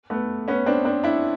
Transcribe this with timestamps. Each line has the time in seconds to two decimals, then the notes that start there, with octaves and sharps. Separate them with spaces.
0.10 A3 B3
0.48 B3 C#4
0.66 C4 D4
0.85 C4 D4
1.04 D4 E4